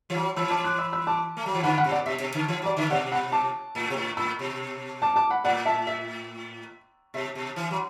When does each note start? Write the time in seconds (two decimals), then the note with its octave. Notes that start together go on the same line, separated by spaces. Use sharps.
0.10 E3
0.15 F#3
0.36 E3 B5 E6
0.51 A5 D6
0.64 D6 F#6
0.79 B5 E6
0.92 B5 E6
1.07 A5 D6
1.37 A3
1.46 F#3
1.54 E3
1.63 D3 F#5 B5
1.78 F#5 B5
1.84 B2
1.91 D5 F#5
2.06 B2 E5
2.20 B2
2.34 D3
2.48 E3
2.62 F#3 D5
2.77 D3 E5
2.90 B2 D5 F#5
3.12 F#5 B5
3.32 A5 D6
3.75 A2
3.90 B2
3.97 A2
4.17 A2 B5 E6
4.39 B2
5.02 A5 D6
5.16 A5 D6
5.30 F#5 B5
5.44 A2 D5 F#5
5.65 E5 A5
5.87 E5
7.14 B2 E5
7.35 B2
7.56 E3
7.71 F#3